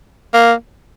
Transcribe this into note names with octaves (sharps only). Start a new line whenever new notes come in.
A#3